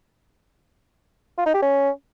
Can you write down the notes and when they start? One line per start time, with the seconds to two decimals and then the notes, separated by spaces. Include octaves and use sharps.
1.38 F4
1.46 D#4
1.54 G4
1.62 C#4